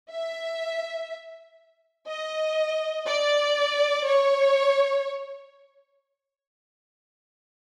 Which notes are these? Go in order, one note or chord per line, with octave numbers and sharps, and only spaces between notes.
E5
D#5
D5
C#5